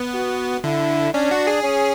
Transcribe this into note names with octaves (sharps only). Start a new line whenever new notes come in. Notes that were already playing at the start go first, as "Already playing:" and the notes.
Already playing: B3
F#4
D3 E4
C#4 D4
F#4
G#4
C#4